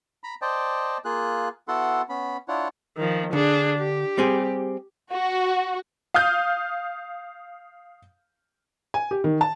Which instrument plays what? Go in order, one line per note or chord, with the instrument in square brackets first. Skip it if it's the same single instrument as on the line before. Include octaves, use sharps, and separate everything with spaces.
[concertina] A#5 B5
C5 D5 D#5 G5 A5
A#3 F4 G#4 F#6
B3 E4 F#4 A4 F#5 C6
B3 C#4 B5
D4 E4 F4 C#5 F#5
[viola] D#3 F3
[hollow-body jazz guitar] D3 [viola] D4 G#4
[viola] G4
[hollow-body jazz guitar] G3 C4 G#4
[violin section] F#4
[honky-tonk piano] F5 D#6 F6 G6
[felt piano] G#5
G4
D#3
A5